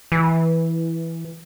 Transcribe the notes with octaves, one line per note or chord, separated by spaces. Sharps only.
E3